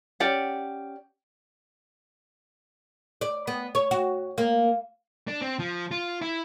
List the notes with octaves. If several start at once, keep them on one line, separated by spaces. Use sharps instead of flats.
C#4 G4 D5 F#5
D5
B3
C#5
F#4
A#3
D4
C4
F3
F4
E4